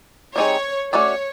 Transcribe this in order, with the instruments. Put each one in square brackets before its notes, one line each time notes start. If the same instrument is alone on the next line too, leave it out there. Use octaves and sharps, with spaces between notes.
[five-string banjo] G3 C4 D#4 G#4 [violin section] C#5
[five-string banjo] A3 C#4 F#4 A4 D5 [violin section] C#5